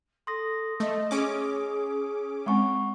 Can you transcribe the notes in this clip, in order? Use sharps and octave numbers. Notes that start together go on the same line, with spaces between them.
A4 C6 D#6 A#6
A3 D#5
C#4 G#4 D6
G#3 C4 F#5 B5 C#6